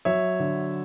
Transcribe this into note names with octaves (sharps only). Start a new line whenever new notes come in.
F#3 C#5 E5
D3